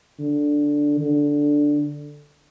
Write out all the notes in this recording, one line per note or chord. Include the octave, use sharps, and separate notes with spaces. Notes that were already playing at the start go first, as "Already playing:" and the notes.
D3
D3